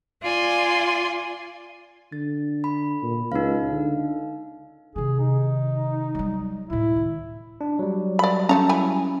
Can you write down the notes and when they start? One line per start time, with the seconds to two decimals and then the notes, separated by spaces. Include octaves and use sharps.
0.22 F4 D5 G#5 C6
2.12 D3 A6
2.64 B5
3.03 A#2
3.32 C#2 D#4 F5
3.71 D3
4.96 C3 D#3 G#4
5.20 D#4
6.15 F#3 G3
6.70 D2 A2 E4
6.96 D#3
7.61 D4
7.79 F#3 G3
8.19 D5 B5
8.49 A3 C#4 A4 A#5
8.69 E4 G#5 B5